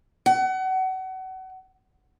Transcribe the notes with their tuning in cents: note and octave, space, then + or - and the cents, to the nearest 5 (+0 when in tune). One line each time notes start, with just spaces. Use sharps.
F#5 +30